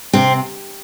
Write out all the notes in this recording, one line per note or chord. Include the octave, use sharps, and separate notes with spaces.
C3 C4